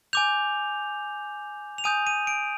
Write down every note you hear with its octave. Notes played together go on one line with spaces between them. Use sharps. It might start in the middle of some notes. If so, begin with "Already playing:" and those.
G#5 D6 G6 F7
F7
G#5 D#6 G6 D#7
D#7
D7